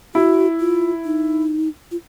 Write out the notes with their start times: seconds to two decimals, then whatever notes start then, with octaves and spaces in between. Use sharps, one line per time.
0.14 E4 F#4
0.60 F4
1.05 D#4
1.91 F4